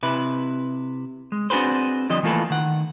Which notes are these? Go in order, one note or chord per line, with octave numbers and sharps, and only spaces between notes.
C3 E4 B4
G#3
C4 D4 F#4 G#4 B4 C5
D3 F3 G3 D#5
E3 A3 A#3 F4 A4 B4
D#3 F#5